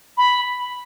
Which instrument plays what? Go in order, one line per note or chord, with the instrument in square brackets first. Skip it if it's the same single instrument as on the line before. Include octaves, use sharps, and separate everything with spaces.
[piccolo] B5